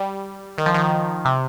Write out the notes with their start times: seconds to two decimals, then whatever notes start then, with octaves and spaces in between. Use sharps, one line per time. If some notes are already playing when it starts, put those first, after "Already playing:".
Already playing: G3
0.58 D#3
0.66 F3
0.74 D#3
1.25 C3